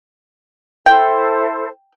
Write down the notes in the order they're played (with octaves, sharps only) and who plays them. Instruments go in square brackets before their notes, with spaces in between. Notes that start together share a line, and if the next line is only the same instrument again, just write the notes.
[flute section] E4 A4 C5 [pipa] G5